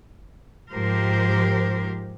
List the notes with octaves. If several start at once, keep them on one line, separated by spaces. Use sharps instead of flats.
G#2 F3 G4 A#4 C5